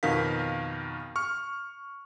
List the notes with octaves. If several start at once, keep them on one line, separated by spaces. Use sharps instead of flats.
F2 B2 D#3 A#4 F5 B6
C#6 F6